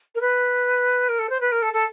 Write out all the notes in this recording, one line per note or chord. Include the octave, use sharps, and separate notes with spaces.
A#4
B4
A#4
A4
C5
B4
A#4
A4
A4